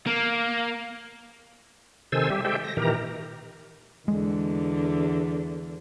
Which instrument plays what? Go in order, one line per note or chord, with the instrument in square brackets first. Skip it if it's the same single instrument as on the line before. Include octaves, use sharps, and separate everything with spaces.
[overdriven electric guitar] A#3
[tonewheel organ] C3 D#3 A4 C5 G#5 E6
G3 G4 E5
G#3 G4 A4 C5 E5 G5
A#6
A#2 D#3 E3 G4 A#4 A#5
[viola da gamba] E2 D3 [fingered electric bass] G#3